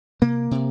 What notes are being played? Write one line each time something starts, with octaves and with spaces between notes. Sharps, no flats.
C3 A#3
C3